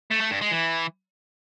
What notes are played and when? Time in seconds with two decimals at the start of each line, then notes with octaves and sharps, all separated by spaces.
0.11 A3
0.21 A3
0.31 G2
0.41 G#3
0.51 E3